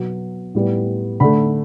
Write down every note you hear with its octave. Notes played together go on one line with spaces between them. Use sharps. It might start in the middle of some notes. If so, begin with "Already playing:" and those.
Already playing: B2 F#3 B3
A2 G3 B3
D3 A3 B5